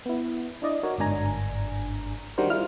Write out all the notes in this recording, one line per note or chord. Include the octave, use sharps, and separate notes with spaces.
B3 E4
D4 E4 D5 D#5
D#4 F#4 A#4 C#5
G1 G#2 D4 G#5 A#5
D#3 G3 D4 F#4 A#4 C5
E4 F4 F6